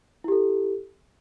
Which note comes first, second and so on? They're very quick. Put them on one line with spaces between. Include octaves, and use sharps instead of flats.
E4 G4 A4